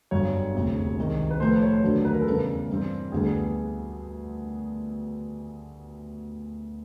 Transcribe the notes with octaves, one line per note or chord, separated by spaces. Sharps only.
G1 G2 D3 F#3 C#5
E1 D2 C3
C2 C3 D#3 G#3
B4
A2 F3 A3 C5
B4
C#5
C5
D#2 D3 F#3 A3 D4
B4
A#4
A4
E2 C#3 E3 G3 A#4
G2 E3 G3 C4
D2 D3 G3 B3 G#4
G#4